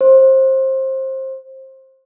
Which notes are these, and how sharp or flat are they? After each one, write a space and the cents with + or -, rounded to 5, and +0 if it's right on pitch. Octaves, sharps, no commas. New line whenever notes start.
C5 +20